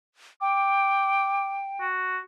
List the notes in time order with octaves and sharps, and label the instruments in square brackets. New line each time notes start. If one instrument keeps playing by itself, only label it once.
[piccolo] G5 [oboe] D6
[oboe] F#4